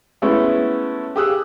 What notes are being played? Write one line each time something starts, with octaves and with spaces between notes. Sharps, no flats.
G#3 A3 B3 C#4 E4 A4
G4 G#4 D#6 E6 F#6